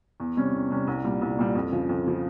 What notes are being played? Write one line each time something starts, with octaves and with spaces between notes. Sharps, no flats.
E2
C3 G3 C#4
E2
C3 G3 C#4
C2
A#2 G3
C2
A#2 G3
F2
C#3 F3
F2
C#3 F3